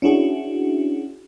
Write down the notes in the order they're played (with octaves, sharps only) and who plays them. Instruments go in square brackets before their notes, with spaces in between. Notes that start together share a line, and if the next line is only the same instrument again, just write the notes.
[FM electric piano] C#4 D4 E4 F#4 G#4